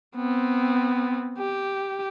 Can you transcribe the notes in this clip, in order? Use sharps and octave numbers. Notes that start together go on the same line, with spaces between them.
B3 C4
G4